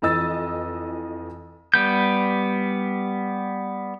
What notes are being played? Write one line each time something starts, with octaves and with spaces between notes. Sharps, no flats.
F2 E3 D#5 E6 A6
G3 B3 G6